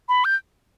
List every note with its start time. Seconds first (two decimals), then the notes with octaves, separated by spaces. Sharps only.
0.09 B5
0.25 G6